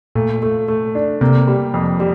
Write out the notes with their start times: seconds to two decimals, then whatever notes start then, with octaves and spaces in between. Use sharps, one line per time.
0.15 A#2 A3
0.42 A3
0.68 A3
0.95 D4
1.21 C3 A#3
1.47 G3
1.74 F2
2.00 G3